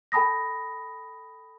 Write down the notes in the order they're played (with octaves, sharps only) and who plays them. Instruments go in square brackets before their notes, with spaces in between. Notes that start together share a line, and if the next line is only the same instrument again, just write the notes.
[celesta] A4 G5 A5 B5 D#6 A#6